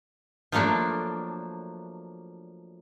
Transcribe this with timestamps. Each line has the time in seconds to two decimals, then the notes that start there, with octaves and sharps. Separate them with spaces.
0.52 F3 F#3 A3 A#3 D4